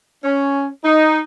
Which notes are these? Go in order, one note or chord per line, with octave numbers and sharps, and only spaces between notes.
C#4
D#4